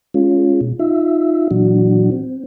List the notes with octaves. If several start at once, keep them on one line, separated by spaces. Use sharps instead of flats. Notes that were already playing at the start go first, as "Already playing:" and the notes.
G#3 C#4 F4
B2
D#4 F4 E5
A#2 E3 F#3 D4 F#4
C4